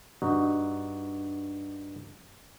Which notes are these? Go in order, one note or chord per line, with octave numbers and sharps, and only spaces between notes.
G2 D#4 F#4